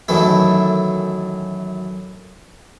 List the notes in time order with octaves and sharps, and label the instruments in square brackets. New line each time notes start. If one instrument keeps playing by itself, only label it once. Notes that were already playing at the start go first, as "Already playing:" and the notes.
[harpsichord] F#2 D#3 E3 A3 E4